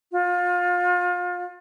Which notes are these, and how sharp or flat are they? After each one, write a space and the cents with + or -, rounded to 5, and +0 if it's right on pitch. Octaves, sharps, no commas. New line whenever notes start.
F4 +30